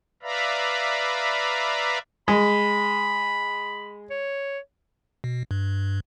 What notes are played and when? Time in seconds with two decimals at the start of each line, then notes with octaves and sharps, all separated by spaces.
0.23 B4 D5 E5 F5 A#5 B5
2.28 G#3 B5
4.10 C#5
5.24 B2
5.51 G2